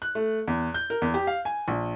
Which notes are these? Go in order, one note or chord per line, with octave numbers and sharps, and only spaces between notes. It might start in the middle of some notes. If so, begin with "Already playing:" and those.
F#6
A3
E2
G6
A#4
E2
G4
F5
G#5
A#1